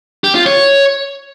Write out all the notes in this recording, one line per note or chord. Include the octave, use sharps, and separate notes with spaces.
G4
F4
C#5